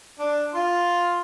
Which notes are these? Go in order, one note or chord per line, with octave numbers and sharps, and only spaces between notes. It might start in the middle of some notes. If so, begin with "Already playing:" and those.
D4
F4 C6